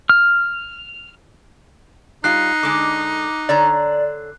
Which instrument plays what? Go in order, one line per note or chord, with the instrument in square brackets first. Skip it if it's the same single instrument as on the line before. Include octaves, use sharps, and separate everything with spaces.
[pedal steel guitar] F6
[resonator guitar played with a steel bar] G3 F4 [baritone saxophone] D#4 [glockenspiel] F#6 C7
[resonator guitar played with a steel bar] D3 G#3 [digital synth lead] D6
[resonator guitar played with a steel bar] D3 C#5 A#5 [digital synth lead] D5